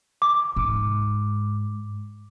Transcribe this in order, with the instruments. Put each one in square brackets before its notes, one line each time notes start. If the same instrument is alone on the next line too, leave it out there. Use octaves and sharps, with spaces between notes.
[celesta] D6
[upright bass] G#2